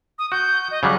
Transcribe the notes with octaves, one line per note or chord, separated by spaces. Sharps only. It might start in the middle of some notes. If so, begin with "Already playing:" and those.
D#6
F#4 G6
D#5
C#3 F#3 G3 F#6